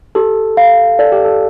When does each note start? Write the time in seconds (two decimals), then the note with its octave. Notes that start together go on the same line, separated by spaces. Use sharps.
0.15 G4 A4
0.57 F5
0.99 A4 D5
1.12 G4
1.25 A4